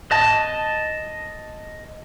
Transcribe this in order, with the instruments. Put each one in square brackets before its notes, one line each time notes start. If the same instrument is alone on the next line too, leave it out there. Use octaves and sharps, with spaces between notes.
[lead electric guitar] D#5 A5